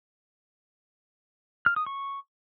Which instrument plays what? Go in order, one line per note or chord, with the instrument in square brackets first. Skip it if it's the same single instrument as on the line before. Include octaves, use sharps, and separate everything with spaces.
[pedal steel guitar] F6
D#6
C#6